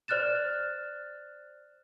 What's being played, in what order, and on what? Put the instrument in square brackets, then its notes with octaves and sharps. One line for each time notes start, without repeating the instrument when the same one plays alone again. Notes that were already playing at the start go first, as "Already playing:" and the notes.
[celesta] C5 D5 F6 F#6 A6 E7